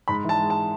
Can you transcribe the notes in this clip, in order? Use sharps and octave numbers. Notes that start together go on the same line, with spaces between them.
G#2 B5
E3 A5
G#3
A5